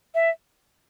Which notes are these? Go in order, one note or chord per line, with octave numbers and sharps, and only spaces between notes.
E5